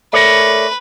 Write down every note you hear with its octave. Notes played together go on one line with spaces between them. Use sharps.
A3 A#4 B4 C#5 D5